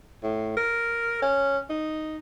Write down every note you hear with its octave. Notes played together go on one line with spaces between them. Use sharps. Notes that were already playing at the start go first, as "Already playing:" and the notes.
A2
A#4
C#4
D#4